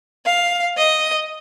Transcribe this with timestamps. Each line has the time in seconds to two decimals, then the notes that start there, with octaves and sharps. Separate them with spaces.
0.26 F5
0.77 D#5